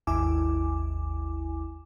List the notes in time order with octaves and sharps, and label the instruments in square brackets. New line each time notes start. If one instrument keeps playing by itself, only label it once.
[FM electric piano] G#1 D#2 E4 G#5 D6